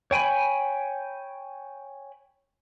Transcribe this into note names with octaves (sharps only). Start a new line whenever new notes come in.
C#5 G5 G#5 B5